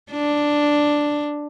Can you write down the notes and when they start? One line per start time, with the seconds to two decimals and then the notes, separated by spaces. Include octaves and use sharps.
0.12 D4